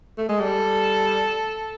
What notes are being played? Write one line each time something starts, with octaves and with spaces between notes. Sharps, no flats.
A3
G#3
G3 A4